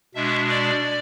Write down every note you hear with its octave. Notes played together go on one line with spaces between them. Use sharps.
B2 G#3 D4 E5
D5